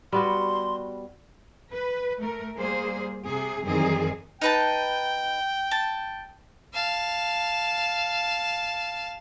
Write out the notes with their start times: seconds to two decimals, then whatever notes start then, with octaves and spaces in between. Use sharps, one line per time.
0.12 G3 B3 F#4 C6
1.72 B4
2.20 A3 A#4
2.57 G3 A#3 G#4 C5
3.26 C3 G#4
3.66 F#2 D#3 E3 G3 C4 G#4
4.41 D#4 B4 G5 A5
5.71 A5
6.74 F5 A5